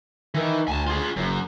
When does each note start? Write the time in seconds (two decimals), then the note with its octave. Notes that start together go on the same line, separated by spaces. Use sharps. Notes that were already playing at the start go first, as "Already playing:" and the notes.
0.34 D#3 E3
0.68 D2 G#5 A5
0.87 F4 G#4
1.16 F#1 F#2